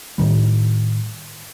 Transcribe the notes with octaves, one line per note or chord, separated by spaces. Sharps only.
A2 D#3 G3